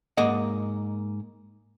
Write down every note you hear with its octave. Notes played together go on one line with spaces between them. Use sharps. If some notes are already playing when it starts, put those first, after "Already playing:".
G#2 A#3 D#5 F#5